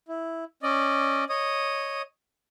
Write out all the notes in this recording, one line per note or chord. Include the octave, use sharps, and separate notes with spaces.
E4
C#4 D5 D#5
C#5 D#5 D#6